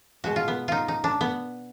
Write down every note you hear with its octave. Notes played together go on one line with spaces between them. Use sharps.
B2 G#3 F#4
F4
B3
D#4 F4
D#4
D4
B3